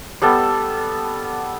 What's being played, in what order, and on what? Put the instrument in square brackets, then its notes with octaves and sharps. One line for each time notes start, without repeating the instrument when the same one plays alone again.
[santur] G3 B3 A4